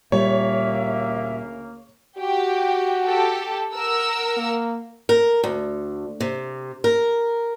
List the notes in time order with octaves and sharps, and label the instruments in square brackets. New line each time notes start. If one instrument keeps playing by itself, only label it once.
[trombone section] D2 C#3 A#3 [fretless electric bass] A#2 G3 [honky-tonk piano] C#5 [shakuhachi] E5
[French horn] F#4 [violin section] G4
[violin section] G4 A4
A#4 F#5 E6
[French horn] A#3
[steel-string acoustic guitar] A#4
D2
C3
A#4